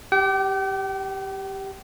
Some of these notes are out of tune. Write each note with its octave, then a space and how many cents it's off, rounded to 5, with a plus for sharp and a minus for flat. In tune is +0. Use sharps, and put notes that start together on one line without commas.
G4 +0 G5 -40